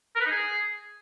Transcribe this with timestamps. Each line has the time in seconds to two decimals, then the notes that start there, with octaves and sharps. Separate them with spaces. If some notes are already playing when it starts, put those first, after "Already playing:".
0.16 A#4
0.21 B4
0.26 D#4
0.31 G#4